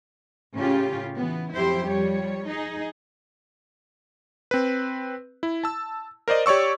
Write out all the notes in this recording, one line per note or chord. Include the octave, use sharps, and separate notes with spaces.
A2 C#3 C#4 F4 G4
E3 B3
F2 F#3 E4 G4 C5
F3 G3 C#5
D#4 G#4
C4 B4
E4
A5 E6
A#4 C5 D5 D#5
G4 C#5 D5 C#6 E6